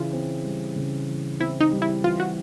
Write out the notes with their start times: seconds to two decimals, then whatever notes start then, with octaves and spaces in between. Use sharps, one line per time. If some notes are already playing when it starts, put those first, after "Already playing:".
Already playing: C#3 E3 F4
0.13 C4
0.44 G3
0.76 C#3
1.09 E3
1.40 C4 E4
1.61 D#4
1.71 G3
1.82 E4
2.03 E3 F4
2.20 F#4